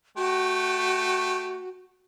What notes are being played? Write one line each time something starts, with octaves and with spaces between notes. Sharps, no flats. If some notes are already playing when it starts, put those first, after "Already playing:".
A3 F#4 G4